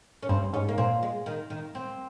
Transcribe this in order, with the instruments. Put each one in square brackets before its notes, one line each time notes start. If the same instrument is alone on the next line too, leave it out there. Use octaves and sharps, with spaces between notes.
[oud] C#4
[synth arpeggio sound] G2 [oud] C4
[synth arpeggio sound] G#2 [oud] C#4
[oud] A#3
[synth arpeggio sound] A#2 [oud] C4
[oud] G#3
D#3
D#3
C4